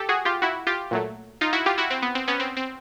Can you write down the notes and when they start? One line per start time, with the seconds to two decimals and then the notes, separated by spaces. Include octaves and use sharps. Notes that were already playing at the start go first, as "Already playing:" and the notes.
Already playing: G4 A4
0.09 F#4 G#4
0.25 F4 G4
0.42 E4 F#4
0.67 F4 G4
0.91 A#2 F#3 A3
1.41 D#4 F4
1.53 E4 F#4
1.66 F4 G4
1.78 E4 F#4
1.90 C4
2.02 B3
2.15 C4
2.28 B3 C#4
2.40 C4
2.57 C4